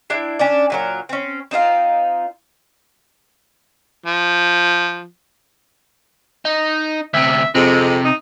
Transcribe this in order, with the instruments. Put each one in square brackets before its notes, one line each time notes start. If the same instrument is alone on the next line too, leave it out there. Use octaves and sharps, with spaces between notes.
[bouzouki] D4 E4 G5
C#4 D4 D5
A#2 F#3 A#4
C4 C#4
C4 D#4 F4 F5
[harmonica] F3
[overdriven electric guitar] D#4
[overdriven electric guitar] D2 C3 [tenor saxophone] E5
[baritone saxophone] F2 [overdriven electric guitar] C3 [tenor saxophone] G#3
[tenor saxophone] D#4